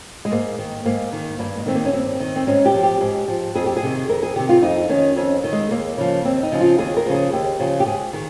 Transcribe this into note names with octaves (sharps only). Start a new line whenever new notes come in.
G#3
G#2 A#3
D#3
G#2 A#3
D#3
G2 A#3
G#3
D#3 C4
A#3
C#4
G2 C4
D#3
C4
G#2 C#4
G4
F3
G4
G#2
F3
F2 G#4
G4
G#4
C3 D#3
F2 A#4
G#4
C3 D#3 G4
F4
F2 D#4
D#3 C#4
F2 C#4
D#3
G#3
D#2 A#3
C#3 F3
D#2 C4
D#4
C#3 F3
F4
D#2 G#4
A#4
C#3 F3
G#4
D#2 G4
C#3 F3
G4
G#2 G#4
D#3